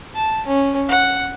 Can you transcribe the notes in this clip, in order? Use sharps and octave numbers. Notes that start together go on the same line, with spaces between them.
A5
C#4
F#5